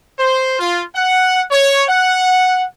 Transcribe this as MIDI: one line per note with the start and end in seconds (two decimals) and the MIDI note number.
0.18 0.58 72
0.59 0.82 65
0.95 1.41 78
1.51 1.83 73
1.89 2.64 78